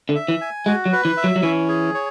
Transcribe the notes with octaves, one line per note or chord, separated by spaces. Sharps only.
D3
E5
E3
G#5
G#3 F#4
F#3
B4
E3
E5
F#3
F#3
E3 C#4
G#4
C#5